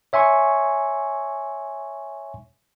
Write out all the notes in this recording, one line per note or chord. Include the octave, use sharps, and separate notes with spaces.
C#5 E5 G#5 C6 C#6